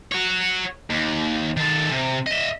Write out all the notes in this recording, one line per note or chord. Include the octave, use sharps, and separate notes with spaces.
F#4 C#5
D#2
D#3 A4
C3
D#5 E5